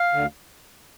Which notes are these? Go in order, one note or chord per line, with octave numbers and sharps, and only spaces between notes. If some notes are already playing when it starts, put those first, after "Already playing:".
Already playing: F5
D2 D3